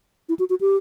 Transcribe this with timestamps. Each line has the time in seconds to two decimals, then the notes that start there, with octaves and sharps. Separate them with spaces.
0.29 E4
0.39 F#4
0.50 F#4
0.61 G4